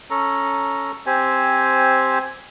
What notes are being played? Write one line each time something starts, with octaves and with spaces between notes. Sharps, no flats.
C#4 A4 A#5
C4 G4 C5 G#5